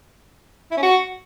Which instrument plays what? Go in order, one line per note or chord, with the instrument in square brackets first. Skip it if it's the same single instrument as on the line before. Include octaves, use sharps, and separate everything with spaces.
[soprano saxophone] E4
C#4
F#4